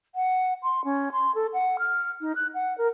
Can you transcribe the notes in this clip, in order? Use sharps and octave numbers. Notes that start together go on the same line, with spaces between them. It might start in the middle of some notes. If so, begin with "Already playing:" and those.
F#5
C6
C#4
C6
A4
F#5
F6
D#4
F#6
F#5
A#4